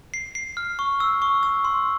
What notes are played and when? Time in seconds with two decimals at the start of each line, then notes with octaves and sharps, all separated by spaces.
0.14 C7
0.35 C7
0.57 F6
0.79 C#6
1.00 E6
1.22 C#6
1.43 E6
1.65 C6